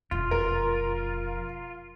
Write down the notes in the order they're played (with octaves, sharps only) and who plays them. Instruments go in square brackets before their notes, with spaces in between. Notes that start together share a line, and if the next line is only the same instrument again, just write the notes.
[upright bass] E1 F2 [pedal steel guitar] F4
[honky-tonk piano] A#4